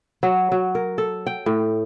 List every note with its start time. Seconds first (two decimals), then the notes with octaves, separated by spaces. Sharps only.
0.23 F#3
0.52 F#3
0.75 A#4
0.98 A4
1.27 G5
1.46 A2